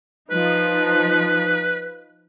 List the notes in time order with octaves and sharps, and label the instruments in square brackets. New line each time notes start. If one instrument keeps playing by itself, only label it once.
[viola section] F3 D#4 [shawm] B4